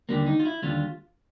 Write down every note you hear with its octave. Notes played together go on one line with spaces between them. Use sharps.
D#2 D3 G3 A#3
D#4
F4
E4
D#2 D3 G3 F4